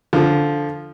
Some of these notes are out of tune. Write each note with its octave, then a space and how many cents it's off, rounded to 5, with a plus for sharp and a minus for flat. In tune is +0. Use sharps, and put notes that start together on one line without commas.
D3 +0 F3 +0